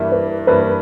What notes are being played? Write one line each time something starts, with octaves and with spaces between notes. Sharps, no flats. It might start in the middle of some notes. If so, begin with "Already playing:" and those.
Already playing: G2 E3 A#3 E4
B4
G2 E3 A#3 E4 B4